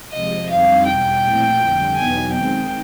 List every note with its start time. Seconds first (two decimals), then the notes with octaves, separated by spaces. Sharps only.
0.12 C3 F3 G#3 D#5
0.49 F2 D3 G3 C4 D#4 F5
0.86 E2 B2 G3 G5
1.23 A#2 F3 A3 C4 E4
1.59 F2 D3 G3
1.96 E2 B2 F#3 B3 D#4 G#5
2.33 D#3 G#3 C4 D#4 G5